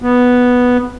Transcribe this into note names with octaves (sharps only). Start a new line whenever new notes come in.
B3